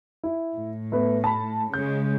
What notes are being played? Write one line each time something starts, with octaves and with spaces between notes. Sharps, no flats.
E4
A2
A3 B3 B4
A5 B5
C#3 G#3 G6